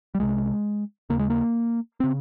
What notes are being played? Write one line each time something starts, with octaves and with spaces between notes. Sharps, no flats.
G3
C2 C3 G#3
D#2 C#3 A#3
G#3
A#3
C#3 C4